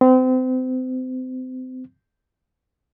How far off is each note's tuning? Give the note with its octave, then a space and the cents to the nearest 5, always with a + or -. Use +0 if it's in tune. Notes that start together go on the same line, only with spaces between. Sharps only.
C4 -35